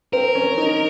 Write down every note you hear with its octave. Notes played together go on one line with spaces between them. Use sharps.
C4 A#4
C#4
D#4